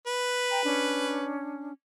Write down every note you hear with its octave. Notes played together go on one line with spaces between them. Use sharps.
B4
G5 A#5
C#4 D4